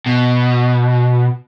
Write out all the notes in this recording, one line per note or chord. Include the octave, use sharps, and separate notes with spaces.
B2